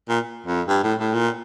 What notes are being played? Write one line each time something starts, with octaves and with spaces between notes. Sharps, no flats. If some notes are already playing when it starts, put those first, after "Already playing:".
A#2
F2
G2
A2
A2
A#2